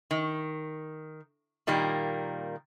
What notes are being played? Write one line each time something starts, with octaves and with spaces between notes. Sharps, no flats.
D#3
A#2 D#3 G3 A#3